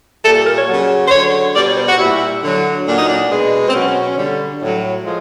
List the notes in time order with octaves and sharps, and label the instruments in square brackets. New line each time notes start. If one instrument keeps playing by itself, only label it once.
[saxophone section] A#2 G3 A4
A#4
C#5
C#3 F#3
C5
D3 F#3 C#5
B2 G3 D5
C#5
C5
F#4
A#2 G3 E4
D3 F#3
A#2 F#3 D4
D#4
D4
B2 G#3
C4
B2 F#3 C#4
D3 G3
A2 F#3
F3 G#3